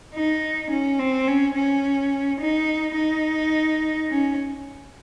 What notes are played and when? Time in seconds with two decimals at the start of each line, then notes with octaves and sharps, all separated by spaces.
0.14 D#4
0.71 C#4
0.99 C4
1.28 C#4
1.55 C#4
2.41 D#4
2.97 D#4
4.10 C#4